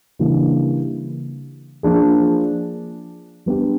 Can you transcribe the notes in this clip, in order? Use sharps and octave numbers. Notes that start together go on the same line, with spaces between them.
C#3 E3 G3 A#3 D4
F3 A#3 D4 F4 G#4
G3 B3 D4 G4